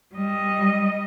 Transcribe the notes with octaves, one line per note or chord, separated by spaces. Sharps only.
G3 D#5